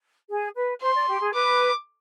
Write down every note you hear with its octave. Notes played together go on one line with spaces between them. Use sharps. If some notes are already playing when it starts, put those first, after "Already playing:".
G#4
B4
C5 C6
D5
G4
G#4
B4 D6